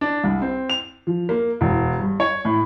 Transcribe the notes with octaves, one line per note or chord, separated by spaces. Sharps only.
D4
C2
C4
F7
F3
A#3
E1
G2
C#5
A2